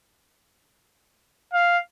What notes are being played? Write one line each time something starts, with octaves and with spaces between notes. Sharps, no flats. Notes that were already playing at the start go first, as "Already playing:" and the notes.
F5